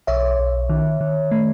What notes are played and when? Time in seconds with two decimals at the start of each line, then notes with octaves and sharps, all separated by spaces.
0.07 B1 C#5 E5
0.39 B1
0.70 D#3
1.01 D#3
1.31 A3